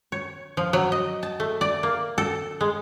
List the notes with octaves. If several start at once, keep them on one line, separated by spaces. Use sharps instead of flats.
C#5
F3
F#3
D#5
A5
A3
D5
A#3
A4
G#3